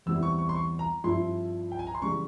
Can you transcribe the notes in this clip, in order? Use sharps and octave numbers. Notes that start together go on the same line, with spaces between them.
E2 E3 G3 C4 E4 E6
C#6
C#6
C6
C#6
A#5
G2 F3 C4 E4 C6
G5
G#5
A#5
C6
C#3 E3 G3 C#6